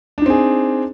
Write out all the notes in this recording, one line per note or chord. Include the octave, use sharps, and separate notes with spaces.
C4 D4 D#4 G#4